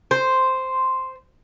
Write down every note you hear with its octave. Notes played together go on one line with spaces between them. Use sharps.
C5